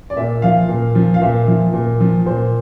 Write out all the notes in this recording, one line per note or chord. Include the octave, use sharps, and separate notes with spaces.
D5
A#2 E5
F3 F5
A#2
F3
F5
A#2 E5
F3
A#2
F3
A#2 C5